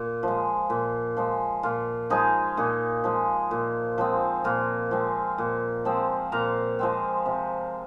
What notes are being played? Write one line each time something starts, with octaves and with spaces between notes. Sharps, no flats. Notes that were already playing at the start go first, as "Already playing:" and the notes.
Already playing: A#2 F4
F3 G#3
A#2
F3 G#3
A#2 F4
F3 G#3 D#4 G#4
A#2 D#4 G#4
F3 G#3
A#2
F3 G#3 C4
A#2 F4 A#4
F3 G#3 C4
A#2
F3 G#3 C4
A#2 F5 A#5
F3 G#3 C4
C3